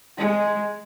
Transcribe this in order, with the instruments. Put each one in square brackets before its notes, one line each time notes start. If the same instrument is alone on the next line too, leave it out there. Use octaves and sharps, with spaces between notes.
[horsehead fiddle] G#3